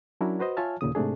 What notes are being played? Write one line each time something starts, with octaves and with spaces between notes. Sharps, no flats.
F#3 C#4 D4 E4 A#4
F#4 B4 C5 D#5
F4 C#5 E5 G#5 A5 F6
D#2 A#2 C#3 D#6
G#2 C3 A3 D4 G#4